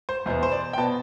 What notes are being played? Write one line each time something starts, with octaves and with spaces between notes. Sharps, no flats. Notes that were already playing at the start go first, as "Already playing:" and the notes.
C5
E2 B2 B3 C5
C5
D5
G5
B2 B3 A5